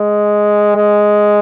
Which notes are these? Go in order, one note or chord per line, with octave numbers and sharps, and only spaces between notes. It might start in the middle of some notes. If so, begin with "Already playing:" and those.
Already playing: G#3
G#3